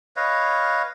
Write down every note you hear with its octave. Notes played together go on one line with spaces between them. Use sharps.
B4 C#5 D#5 F5